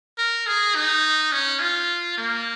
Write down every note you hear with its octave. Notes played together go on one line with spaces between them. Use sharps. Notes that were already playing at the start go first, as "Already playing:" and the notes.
A#4
G#4
D#4
C#4
F4
A#3